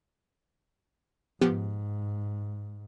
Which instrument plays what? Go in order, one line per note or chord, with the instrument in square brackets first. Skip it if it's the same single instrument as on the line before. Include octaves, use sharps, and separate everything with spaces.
[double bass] G#2 [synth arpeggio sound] F3 B3 G4